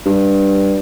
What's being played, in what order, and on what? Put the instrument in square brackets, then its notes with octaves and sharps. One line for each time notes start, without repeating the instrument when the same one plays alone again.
[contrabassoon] G2